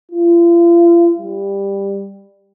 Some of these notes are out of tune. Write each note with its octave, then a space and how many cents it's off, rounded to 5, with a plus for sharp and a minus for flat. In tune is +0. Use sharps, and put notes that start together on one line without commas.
F4 -40
G3 +15